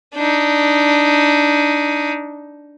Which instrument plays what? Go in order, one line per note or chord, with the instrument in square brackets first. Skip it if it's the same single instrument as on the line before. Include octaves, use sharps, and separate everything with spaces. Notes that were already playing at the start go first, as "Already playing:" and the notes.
[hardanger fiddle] D4 D#4